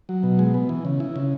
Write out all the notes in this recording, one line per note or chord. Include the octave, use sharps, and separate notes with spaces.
F#3
B2
G#3
B3
E3
C#3
E4
C#3